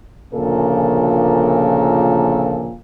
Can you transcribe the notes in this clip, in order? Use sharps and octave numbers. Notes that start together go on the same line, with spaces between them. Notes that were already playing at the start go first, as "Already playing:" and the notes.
D2 A#2 C#3 F3 A4 A#4